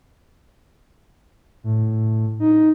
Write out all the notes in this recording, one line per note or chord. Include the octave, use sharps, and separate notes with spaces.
A2
D#4